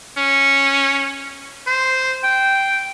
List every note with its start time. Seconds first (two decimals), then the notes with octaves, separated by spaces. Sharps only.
0.17 C#4
1.67 C5
2.24 G5